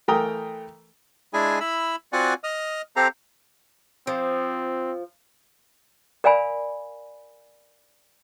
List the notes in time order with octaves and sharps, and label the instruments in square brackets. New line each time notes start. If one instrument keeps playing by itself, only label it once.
[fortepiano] E3 A3 A#4 G5 A#5 D#6
[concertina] G#3 D4 E4 G#4 G#5
E4 B5 E6
C4 F4 F#4 D5 F#5 G#5
D#5 D#6 F6
C4 G4 A4 C5 F5 A#5
[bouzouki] F3 [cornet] C4
[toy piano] A#4 D5 F5 G#5 B5